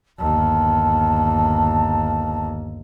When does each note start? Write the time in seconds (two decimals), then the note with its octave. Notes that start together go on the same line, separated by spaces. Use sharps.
0.19 G1 D#2 A5